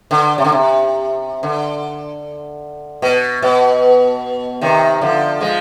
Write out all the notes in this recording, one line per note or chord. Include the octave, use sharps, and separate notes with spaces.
D3
C3
D3
C3
D3
B2
B2
C3 D#3
D3 F3
F3 G#3